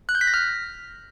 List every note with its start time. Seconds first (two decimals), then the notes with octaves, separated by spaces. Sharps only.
0.09 F#6
0.15 G6
0.21 B6
0.27 A#6
0.34 F6